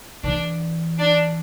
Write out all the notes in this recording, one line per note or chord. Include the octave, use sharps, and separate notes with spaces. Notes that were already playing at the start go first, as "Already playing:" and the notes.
E3 D4
D4